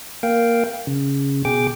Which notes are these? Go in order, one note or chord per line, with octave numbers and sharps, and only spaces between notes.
A#3 F5 G5
C#3
B2 G#4 G5 D6